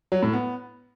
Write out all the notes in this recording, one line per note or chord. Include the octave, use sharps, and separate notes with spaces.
F#3
A2
B3